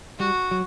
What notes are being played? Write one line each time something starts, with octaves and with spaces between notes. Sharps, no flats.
G3 F#4
F#3